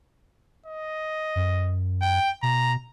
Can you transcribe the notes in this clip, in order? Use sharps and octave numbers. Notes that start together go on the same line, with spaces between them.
D#5
F#2
G5
B2 A#5